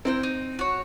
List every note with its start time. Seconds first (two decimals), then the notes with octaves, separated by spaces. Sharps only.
0.05 C4 E4 A#4 G5
0.23 D#4
0.59 F#4 C#5